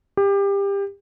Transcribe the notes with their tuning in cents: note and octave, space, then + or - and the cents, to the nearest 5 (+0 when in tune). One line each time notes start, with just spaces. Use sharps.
G4 +25